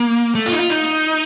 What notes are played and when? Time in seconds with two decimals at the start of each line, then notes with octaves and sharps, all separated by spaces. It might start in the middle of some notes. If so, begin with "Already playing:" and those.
Already playing: A#3
0.35 A3
0.46 F4
0.52 D#4
0.59 F4
0.70 D#4